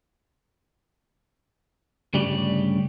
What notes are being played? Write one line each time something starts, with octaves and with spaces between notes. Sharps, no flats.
D2 G2 C#3 G3 G4 D5